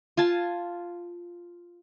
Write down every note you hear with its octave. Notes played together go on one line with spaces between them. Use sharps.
F4 G#5 A5